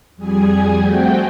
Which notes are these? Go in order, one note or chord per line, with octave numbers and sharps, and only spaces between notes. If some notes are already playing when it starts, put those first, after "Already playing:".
F2 G3 G#4 G#5
A3 C4 F#4 G5